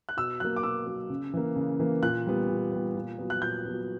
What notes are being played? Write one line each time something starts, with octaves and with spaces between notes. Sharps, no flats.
F#6
B2 E6
F#3 A#3 F#6
D6
B2 E6
F#3 A#3
C#3
E3 A#3
C#3
E3 A#3
A#2 F#6
G3 B3
A#2
G3 B3
A#2
F#3 B3
F#6
A#2 G6
F#3 B3